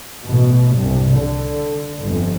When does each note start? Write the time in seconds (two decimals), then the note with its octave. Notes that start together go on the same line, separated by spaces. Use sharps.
0.23 A1 B2
0.76 C2 G2
1.16 D3
2.03 G1 F2